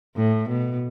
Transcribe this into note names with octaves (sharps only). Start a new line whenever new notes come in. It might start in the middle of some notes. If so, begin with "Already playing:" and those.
A2
B2